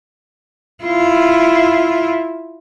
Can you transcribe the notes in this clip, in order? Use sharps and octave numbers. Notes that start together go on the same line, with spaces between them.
E4 F4